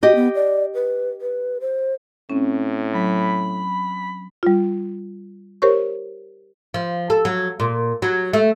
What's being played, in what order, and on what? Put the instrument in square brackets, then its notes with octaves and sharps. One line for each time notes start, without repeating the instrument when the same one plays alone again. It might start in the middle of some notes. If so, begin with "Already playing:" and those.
[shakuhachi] F#4 [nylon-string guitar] G4 D#5
[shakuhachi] B3
D5
B4
B4
C5
[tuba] A2 [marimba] C4 C#4
[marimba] F#3 [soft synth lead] B5
[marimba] G3 F4
G4 A#4 C5 C#5 C#6
[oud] F3
A4
F#3
A#2
F#3
A3